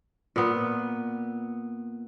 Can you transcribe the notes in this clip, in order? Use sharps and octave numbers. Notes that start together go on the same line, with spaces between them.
A#2 B3